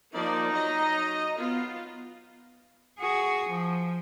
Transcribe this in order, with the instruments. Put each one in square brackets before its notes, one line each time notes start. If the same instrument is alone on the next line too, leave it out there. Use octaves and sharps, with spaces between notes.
[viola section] F3 A#3 D5 [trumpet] D#4
[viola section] F#3 D#5 A#5
B3 F4
[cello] F#4 G#4
F3